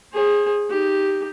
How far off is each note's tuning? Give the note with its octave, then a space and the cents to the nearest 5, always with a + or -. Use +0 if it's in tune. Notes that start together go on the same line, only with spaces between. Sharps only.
G#4 -10 C5 +35
D#4 +0 G4 +0